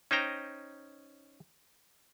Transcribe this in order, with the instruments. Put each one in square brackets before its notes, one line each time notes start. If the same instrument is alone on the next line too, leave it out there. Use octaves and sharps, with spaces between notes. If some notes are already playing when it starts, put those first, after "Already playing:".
[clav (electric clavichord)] C#4 D#4 C5 G5 A#5